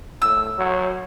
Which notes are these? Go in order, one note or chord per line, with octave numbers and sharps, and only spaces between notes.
A2 E6
F#3